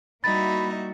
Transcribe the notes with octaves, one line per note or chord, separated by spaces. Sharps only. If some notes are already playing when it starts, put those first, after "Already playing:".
G3 A#3 D#4 E4 F#4 E5 B5 A6